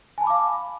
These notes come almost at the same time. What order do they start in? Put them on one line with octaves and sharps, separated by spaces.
G#5 A5 B5 D6 F5